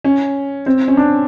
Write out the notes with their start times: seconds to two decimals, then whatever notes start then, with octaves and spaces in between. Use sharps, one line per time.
0.04 C#4
0.66 C4
0.88 C#4
0.97 D4